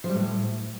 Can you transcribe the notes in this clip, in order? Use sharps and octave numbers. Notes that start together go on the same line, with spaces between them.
F3
G3
A2